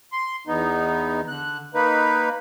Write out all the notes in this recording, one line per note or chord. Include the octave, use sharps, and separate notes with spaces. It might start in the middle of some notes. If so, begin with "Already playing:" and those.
C6
E2 B3 D#4
D3 F#6
A#3 D#4 B4